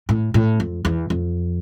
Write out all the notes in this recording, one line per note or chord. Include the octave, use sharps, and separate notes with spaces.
A2
A2
F2
E2
F2